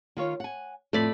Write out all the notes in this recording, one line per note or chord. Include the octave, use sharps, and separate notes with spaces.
D#3 F4 C#5
F#5 G#5
F2 A2 A3 D5 B5